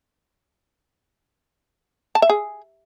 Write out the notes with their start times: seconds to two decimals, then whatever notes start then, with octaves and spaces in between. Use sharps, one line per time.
2.15 A5
2.22 E5
2.29 G#4